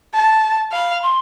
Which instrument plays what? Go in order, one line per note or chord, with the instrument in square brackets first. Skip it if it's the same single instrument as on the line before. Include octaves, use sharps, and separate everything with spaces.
[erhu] A5
[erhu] F5 [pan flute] B5
[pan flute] C6